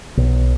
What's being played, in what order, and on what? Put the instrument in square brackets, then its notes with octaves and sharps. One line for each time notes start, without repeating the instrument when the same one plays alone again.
[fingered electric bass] B1